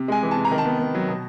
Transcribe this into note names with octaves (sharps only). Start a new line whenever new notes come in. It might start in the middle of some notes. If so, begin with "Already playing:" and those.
Already playing: C3
G#3 G#5
E3
C3 A5
A#5
D#3
A5
B3
B3
F#3
B2